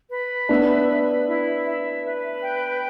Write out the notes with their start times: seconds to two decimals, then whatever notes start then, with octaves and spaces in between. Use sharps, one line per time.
0.11 B4
0.49 B3 D4 E5
0.89 B4
1.27 E4
1.66 E5
2.04 B4
2.43 G5